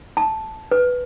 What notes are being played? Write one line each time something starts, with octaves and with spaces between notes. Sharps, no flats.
A5
B4